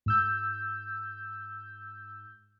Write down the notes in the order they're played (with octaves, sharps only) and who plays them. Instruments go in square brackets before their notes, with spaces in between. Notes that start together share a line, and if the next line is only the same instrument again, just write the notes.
[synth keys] G#2 E6 G6